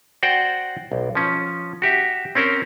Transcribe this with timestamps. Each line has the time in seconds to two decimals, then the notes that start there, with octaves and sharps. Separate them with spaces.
0.23 F#4 C5 D5 F#5 G5
0.92 B1
1.15 F3 C#4
1.82 F#4 G4 E5
2.35 C4 C#4 A#4 C5